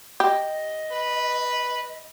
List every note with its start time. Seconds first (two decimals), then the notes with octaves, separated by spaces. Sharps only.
0.20 G4 D#5
0.92 B4